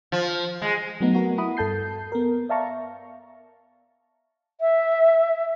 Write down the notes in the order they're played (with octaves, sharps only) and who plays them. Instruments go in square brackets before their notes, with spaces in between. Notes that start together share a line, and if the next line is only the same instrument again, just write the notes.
[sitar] F3
G#3
[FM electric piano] F#3 A3 B3 D#4
B3 F#4 A#4
E4 F#5 B5 D#6
G2 A4 A5 G6 C7
B3 A#4
D5 E5 F5 A5 A#5 C#6
[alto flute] E5